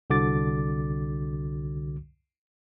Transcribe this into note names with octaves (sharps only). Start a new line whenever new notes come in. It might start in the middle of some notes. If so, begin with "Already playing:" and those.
C2 D3 F#4 D6 A6